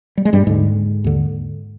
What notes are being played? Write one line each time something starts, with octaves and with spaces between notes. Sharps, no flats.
G3
G#3
G2 G3
D#2 G#2 D3 G#3
D#2 D3